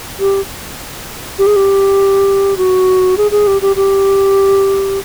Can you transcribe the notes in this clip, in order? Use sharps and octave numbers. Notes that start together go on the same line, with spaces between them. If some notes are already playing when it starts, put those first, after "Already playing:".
G4
G4
G#4
G4
F#4
G#4
G#4
G4
G4
G4